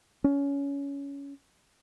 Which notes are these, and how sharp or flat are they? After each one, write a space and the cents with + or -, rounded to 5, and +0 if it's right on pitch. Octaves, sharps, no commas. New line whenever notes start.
C#4 +20